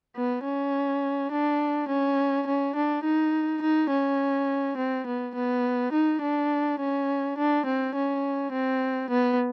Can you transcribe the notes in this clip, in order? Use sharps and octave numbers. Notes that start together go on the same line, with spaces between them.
B3
C#4
D4
C#4
C#4
D4
D#4
D#4
C#4
C4
B3
B3
D#4
D4
C#4
D4
C4
C#4
C4
B3